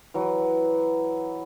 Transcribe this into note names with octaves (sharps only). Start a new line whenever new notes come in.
E3 F#3